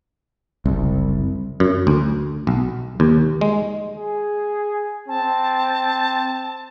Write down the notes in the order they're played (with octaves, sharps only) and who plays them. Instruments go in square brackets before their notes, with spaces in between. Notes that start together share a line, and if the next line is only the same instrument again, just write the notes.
[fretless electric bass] F#1 C2
[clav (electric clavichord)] F#2
D2
B1
D#2
G#3
[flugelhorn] G#4
[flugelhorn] C4 [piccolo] A5